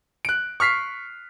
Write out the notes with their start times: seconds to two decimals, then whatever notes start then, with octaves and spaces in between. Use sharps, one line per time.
0.25 F#6 D7
0.60 C#6 F6 B6 C7